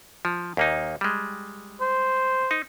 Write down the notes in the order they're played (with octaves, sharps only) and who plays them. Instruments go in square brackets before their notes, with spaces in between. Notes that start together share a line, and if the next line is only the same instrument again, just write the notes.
[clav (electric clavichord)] F3
D#2 A#3 D#4
G3 G#3
[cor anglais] C5
[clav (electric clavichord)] D#4